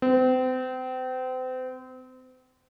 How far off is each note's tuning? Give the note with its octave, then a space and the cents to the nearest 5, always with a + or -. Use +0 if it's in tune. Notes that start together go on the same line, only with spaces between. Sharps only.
C4 -35